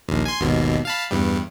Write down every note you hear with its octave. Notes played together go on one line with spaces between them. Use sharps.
A#1 D#2
G#5 C6
G#1 D#2 B2
F5 A5 B5
E2 G2 G3